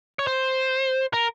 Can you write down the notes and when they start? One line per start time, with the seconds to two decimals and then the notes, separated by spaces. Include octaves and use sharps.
0.19 C#5
0.27 C5
1.13 A#4